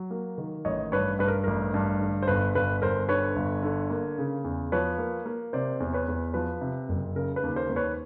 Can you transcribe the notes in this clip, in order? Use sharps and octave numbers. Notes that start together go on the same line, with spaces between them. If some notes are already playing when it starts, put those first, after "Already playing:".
Already playing: F#3
A#3
D#3
A1 C#5 D#5
G2 B4 C#5
G2 B4
A#4
A1 A#4
G2
D3
C5
G1 B4
G1 B4
G1 A#4 C5
D3 B4 C#5
G1
D3
A#3
C#3
E2
F3 B4 C#5
A#3
A#3
C3 C5 D5
E2
B4 C#5
E2
F3 B4
C3
F#1
C#3 A#4
B4
D#2
A#4 C5
D#2
B4 C#5